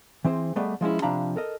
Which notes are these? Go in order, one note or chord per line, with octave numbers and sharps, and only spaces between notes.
E3 C4 G#4 C5
G3 A3 B3 G#4 D5 D#5
F3 G#3 C#4 E4
C3 F3 D4 F5 A#5 B5
A4 A#4 D#5